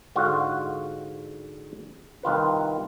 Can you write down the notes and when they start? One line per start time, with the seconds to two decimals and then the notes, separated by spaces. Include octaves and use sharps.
0.16 G#2 D3 F4 F#4
2.23 C2 D#3 F4 B4